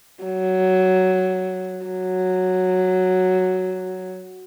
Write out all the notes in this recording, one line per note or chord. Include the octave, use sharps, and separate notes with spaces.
F#3
F#3